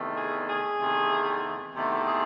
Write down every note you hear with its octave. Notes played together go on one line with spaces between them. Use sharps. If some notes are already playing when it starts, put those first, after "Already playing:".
Already playing: E2 C3 D#3 A3
G#4
G#4
E2 C3 D#3 A3
E2 C3 D#3 A3
G#4